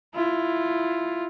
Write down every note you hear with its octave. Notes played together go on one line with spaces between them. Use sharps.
E4 F4